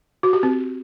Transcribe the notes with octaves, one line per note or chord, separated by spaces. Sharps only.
F#4
G4
C4